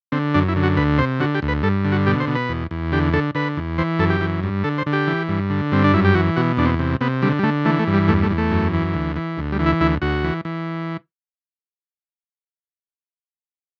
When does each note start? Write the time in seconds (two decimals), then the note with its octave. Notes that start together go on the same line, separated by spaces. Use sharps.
0.12 D3 C4
0.34 F#2 D4
0.48 E4
0.56 D3
0.63 F#4
0.77 D2 B4
0.98 C3 C5
1.20 D3 F#4
1.35 G4
1.42 D2
1.48 B4
1.63 G2 A4
1.84 D3
1.92 F#4
2.06 B2 G4
2.20 C5
2.27 B2
2.35 B4
2.49 E2
2.71 E2
2.92 D3 G4
3.13 D3 A4
3.35 D3 B4
3.57 E2
3.78 E3 C5
3.99 F#2 A4
4.10 G4
4.21 E3
4.43 G2
4.64 D3 A4
4.78 C5
4.86 D3
4.93 G4
5.07 E3
5.29 G2
5.50 D3
5.72 G2 C4
5.84 D4
5.93 F#2 E4
6.05 G4
6.15 E3 F#4
6.36 B2 F#4
6.57 E2 D4
6.66 C4
6.79 C3
7.01 C3 B3
7.22 D3 G3
7.39 G3
7.43 D3 A3
7.65 E3 A3
7.79 A3
7.87 G2
7.94 G3
8.08 E2 A3
8.23 A3
8.30 E2
8.38 A3
8.51 F#2
8.73 E3
8.94 D2
9.16 E3
9.38 D2
9.52 G3
9.59 E3
9.66 E4
9.80 D2 E4
10.02 D2 F#4
10.24 E3
10.45 E3